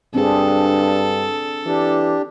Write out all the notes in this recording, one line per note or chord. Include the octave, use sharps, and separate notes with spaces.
G2 C4 D4 G#4 A4
E3 D4 G4